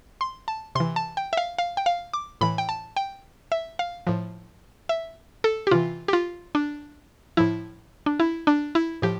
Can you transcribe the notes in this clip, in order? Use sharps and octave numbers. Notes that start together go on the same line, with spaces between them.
C6
A5
C3 E3 C6
A5
G5
E5
F5
F5
G5
F5
D6
A2 E3 B5
G5
A5
G5
E5
F5
A2 F3
E5
A4
G4
C3 E3 F4
G4
F4
D4
A2 F3 E4
D4
E4
D4
E4
A2 F3 G4